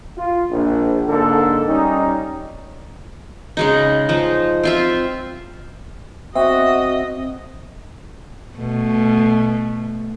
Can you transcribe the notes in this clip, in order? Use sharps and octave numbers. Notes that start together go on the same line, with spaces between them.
F4
A#1
G#2 D3 A#3 A4
G3 C#4 D#4
C#3 G#3 D#4
F3 D#4
C4 F4 E5
C4 F#4 D#5 E5
B2 A3